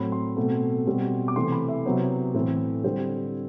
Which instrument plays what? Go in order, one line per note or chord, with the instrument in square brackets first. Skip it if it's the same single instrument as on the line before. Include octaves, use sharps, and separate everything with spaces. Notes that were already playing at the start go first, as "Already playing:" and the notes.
Already playing: [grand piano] A2 F#3 C4 B5
C6
B2 A3 C4
B2 G3 C4
D6
C3 E3 A3 C4 C6
B5
E5
C3 F#3 B3 C5
A2 E3 A3 C4
D3 G3 C4 C5